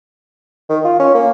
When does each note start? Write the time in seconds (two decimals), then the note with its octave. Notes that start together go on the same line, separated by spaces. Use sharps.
0.70 D#3
0.84 F4
1.00 C#4
1.14 A#3